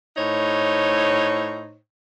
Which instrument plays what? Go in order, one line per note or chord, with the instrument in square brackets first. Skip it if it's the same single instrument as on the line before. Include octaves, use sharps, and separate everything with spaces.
[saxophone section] A2 D#4 C5 C#5